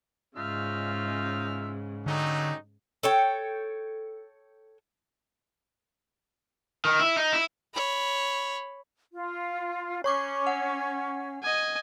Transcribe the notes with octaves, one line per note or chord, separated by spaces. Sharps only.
G#2 C#3 C#4 D#4 F4 E5 F6
D3 F#3 G3 A3 C#4 D#4
A4 C#5 G5
D#3
E4
D#4
E4
C#5 B5
F4
C#4 C#5 C#6 D6
F#5
D#5 G#5